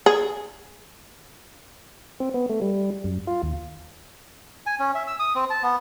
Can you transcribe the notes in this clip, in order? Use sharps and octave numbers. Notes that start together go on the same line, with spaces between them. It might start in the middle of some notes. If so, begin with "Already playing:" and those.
G#4
C4
B3
A3
G3
F#2
F4
D#2
G#5
C#4
E5
E6
D#6
C4
A5
B3